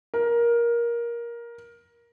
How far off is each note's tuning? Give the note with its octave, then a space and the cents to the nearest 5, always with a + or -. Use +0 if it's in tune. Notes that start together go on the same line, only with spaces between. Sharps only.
A#4 +15